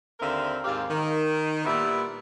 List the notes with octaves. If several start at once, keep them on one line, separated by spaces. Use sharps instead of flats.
D#2 D3 C4 A#4 E5 F5
D#2 G#2 C4 G4 F5
D#3
A#2 G3 B3 E4 E5